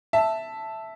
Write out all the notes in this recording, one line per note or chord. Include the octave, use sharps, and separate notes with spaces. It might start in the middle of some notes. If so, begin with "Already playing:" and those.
E5 A5